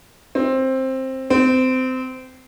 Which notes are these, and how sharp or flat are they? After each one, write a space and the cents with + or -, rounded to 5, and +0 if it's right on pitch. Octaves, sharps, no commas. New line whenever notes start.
C4 +10
C4 -25